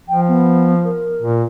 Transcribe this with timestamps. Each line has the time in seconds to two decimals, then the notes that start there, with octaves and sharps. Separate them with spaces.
0.09 F3 G5
0.28 B3
0.84 A#4
1.22 A#2